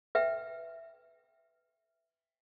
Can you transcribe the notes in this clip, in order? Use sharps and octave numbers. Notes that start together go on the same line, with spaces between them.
B4 E5 G5